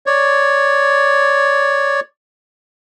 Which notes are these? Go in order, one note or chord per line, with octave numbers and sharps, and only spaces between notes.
C#5 D5